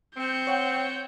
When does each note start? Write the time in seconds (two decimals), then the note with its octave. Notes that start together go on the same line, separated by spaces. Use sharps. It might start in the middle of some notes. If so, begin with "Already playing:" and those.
0.17 C4 G6 C#7
0.47 C#5 F#5 G5